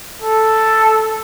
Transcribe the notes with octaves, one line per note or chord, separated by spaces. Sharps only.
A4